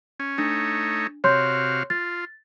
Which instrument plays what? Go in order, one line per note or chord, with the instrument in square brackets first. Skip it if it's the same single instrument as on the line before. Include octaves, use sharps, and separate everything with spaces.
[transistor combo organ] C#4
[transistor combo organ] A3 D#4 C#5 [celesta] D4
[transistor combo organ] C3 F#4 F5 [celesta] C#5 C6 G6
[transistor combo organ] F4 [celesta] A6